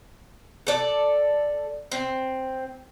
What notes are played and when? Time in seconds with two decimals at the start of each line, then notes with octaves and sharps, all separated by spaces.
0.67 A4 D5
1.92 C4